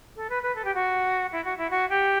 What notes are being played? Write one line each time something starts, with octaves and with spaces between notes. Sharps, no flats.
A4
B4
B4
A4
G4
F#4
E4
F#4
E4
F#4
G4